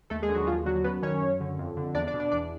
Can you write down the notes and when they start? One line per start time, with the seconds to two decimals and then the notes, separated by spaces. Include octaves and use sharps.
0.10 D#2 A3 A4
0.22 G#3 G#4
0.29 D3
0.35 F#3 F#4
0.47 D#2 F3 F4
0.66 D3 F#3 F#4
0.84 F#2 B3 B4
1.02 D#3 C#4 C#5
1.22 F#2
1.40 D3
1.59 F2
1.77 D3
1.95 E2 D4 D5
2.07 D4 D5
2.14 B2
2.20 D4 D5
2.32 E2 D4 D5